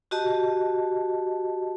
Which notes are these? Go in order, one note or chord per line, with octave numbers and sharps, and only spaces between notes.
F#4 G4 D#5 A5